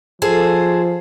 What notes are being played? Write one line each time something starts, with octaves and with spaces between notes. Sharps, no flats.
F3 G#4 A4 C5